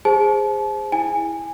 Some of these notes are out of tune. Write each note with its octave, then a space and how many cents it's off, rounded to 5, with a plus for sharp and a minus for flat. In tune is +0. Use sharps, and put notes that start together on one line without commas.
G#4 -20 C5 +0 A5 -35
E4 -5 G#5 -15